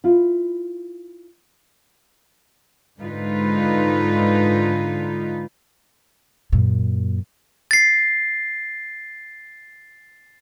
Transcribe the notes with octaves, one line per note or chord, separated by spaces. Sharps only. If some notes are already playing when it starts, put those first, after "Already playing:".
E4 F4
G#2 D3 D#4 F4 B4
F#2 A#2
A6 C7